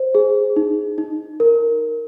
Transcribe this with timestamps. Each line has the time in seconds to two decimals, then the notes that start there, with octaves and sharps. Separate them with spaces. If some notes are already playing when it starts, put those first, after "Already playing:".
Already playing: C5
0.15 G#4
0.56 D#4
0.98 D#4
1.40 A#4